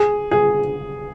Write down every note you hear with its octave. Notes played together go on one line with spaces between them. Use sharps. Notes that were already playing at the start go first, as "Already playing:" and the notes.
Already playing: G#4
G#4